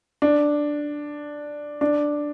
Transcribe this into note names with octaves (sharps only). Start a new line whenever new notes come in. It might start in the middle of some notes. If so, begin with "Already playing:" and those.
D4
D4